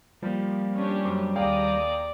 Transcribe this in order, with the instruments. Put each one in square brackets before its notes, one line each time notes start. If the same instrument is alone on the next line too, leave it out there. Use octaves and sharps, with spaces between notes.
[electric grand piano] F3 [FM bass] G3 [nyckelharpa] A#3
[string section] C#4 D4 G4
[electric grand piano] F#2 C5 D6
[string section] D#2 A#5 D#6 [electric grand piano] G#4 F5 G5 [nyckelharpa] D5